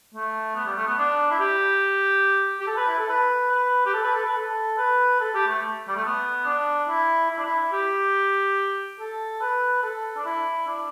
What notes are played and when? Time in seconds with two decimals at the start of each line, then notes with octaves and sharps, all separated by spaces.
0.14 A3
0.55 B3
0.66 G3
0.77 A3
0.87 B3
0.98 D4
1.31 E4
1.40 G4
2.60 G4
2.67 A4
2.77 B4
2.88 E4
2.99 A4
3.09 B4
3.51 B4
3.86 G4
3.94 A4
4.03 B4
4.15 A4
4.25 B4
4.36 A4
4.78 B4
5.20 A4
5.34 G4
5.48 A3
5.88 G3
5.96 A3
6.05 B3
6.46 D4
6.89 E4
7.31 E4
7.38 D4
7.45 E4
7.73 G4
9.00 A4
9.41 B4
9.83 A4
10.17 D4
10.26 E4
10.68 D4